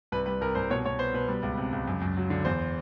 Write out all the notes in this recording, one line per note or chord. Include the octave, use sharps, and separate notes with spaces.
C2 B4
G3 B4
C2 A#4
C2 C5
B2 C#5
B2 C#5
B3 C5
B2 B4
G3
C#2
C3
C#2
F#2
F#2
F#3
D3
E2 C5